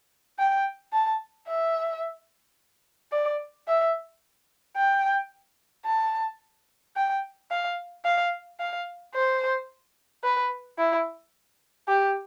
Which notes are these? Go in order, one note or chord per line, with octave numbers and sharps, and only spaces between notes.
G5
A5
E5
D5
E5
G5
A5
G5
F5
F5
F5
C5
B4
E4
G4